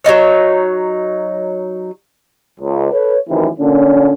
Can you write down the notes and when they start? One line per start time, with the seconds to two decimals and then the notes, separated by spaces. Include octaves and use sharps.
0.04 F#3 B3 D#4 C#5
2.60 C#2
2.92 A4 B4 C#5
3.29 F#2 A2 C3 D#3 E3
3.60 A#2 D3 C#4